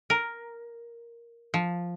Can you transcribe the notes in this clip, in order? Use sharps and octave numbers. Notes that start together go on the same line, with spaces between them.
A#4
F3